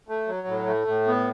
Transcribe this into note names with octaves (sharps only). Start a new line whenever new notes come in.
A3
F#3
A2
A3
A2
B3